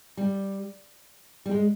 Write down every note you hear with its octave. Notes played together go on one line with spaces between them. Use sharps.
G3
G3
G#3